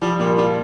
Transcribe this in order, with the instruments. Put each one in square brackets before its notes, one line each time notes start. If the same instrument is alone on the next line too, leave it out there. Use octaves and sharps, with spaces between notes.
[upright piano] F3 [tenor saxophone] G3
[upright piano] A#2 [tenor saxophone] G3
[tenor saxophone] G3 [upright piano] F4